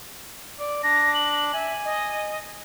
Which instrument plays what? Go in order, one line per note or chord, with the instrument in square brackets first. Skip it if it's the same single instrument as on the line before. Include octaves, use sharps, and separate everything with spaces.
[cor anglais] D5
[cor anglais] D4 [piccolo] A#6
[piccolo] F#7
[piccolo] E5 [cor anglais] G#5
[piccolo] D#5